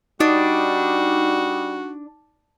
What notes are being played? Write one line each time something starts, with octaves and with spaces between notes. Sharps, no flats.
G3 D4 D#4 F#4